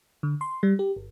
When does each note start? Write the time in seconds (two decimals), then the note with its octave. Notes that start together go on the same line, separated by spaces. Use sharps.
0.23 D3
0.41 C6
0.63 G3
0.79 G4
0.96 G1